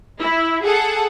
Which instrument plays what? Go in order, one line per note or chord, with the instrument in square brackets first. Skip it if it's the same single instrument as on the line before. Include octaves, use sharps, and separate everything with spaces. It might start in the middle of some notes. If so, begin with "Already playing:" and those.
[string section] E4
G#4 A4 F#5